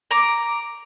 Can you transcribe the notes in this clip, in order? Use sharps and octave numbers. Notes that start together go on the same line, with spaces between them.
A#5 D6